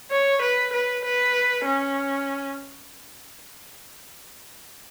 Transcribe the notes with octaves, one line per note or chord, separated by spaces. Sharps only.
C#5
B4
B4
B4
C#4